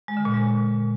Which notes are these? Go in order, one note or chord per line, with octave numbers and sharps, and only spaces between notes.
G#3
D3
A#2
G#3